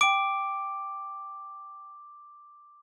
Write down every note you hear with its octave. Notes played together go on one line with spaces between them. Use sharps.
G5 D6 D7